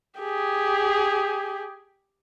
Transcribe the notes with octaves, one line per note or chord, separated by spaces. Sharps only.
G4 G#4